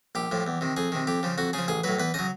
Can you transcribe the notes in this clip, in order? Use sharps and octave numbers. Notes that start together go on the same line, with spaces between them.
A#1 G4
A2 F3
E2
C3 D#3
F2 G#4
C3 D#3
F2 G4
C#3 F3
F2 F#4
C#3 F3 G#4
A1 G#4
A2 F#3 B4
E2 B4
C#3 F#3 D#5